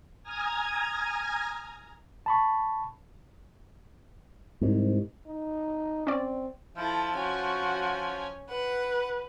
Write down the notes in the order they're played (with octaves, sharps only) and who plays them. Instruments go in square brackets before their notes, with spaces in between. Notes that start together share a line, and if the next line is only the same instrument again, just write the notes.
[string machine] G#5 A#5 D#6 F6 G#6 A#6
[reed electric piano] A5 B5 C#6
[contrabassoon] C2 [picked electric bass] G#2
[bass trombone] D#4
[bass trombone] C4 [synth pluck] C#4 D5
[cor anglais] F3 [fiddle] E4 A4
[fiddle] C#4 G#5 [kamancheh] F#4
[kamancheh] B4 [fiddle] F#5